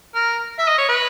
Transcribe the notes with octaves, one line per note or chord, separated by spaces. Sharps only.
A#4
E5
D#5
C#5
B4